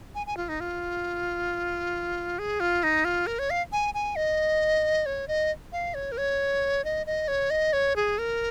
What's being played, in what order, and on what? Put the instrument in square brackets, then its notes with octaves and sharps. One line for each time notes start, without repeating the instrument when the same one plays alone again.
[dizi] G#5
G#5
F4
D#4
F4
G#4
F4
D#4
F4
A#4
C#5
F5
G#5
G#5
D#5
C#5
D#5
F5
C#5
A#4
C#5
D#5
D#5
C#5
D#5
C#5
G#4
A#4